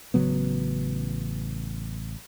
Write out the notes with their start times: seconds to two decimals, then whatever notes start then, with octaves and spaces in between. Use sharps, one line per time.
0.14 A1 C#3 F#3 B3